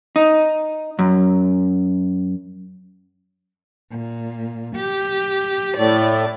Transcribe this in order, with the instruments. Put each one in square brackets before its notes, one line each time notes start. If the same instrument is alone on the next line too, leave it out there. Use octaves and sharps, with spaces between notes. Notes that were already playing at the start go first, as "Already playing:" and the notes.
[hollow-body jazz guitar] D#4
F#2
[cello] A#2
G4
[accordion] A2 [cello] D5